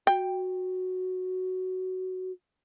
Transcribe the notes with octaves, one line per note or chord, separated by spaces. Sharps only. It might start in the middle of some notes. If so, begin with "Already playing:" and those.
F#4 G5